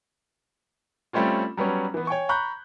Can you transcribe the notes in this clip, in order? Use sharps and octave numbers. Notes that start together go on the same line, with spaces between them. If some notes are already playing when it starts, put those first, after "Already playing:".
G3 A3 C4 C#4 F4
F#3 G3 B3 C#4
E3 B3
C#5 G5 G#5 C#6
A#5 B5 C#6 F#6 G6